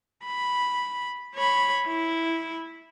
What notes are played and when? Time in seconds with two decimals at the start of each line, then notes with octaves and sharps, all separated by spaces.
0.25 B5
1.35 C#5 B5
1.86 E4